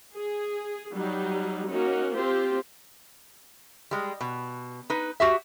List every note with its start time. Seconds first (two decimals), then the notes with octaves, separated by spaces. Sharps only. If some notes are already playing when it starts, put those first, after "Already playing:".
0.14 G#4
0.93 F#3 G3 D#4
1.69 A#3 C#4 D#4 F#4
2.12 C4 F4 G4 C5
3.91 G3 G#3
4.21 B2
4.90 D#4 B4
5.20 F#4 G4 E5